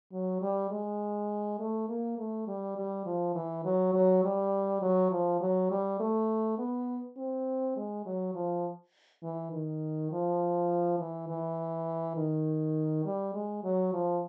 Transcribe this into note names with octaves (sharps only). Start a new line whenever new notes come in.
F#3
G3
G#3
A3
A#3
A3
G3
G3
F3
E3
F#3
F#3
G3
F#3
F3
F#3
G3
A3
B3
C4
G#3
F#3
F3
E3
D#3
F3
E3
E3
D#3
G3
G#3
F#3
F3